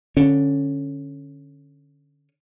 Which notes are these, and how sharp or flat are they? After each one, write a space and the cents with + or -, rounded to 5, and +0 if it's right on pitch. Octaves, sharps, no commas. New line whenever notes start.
D3 +0 C#4 +0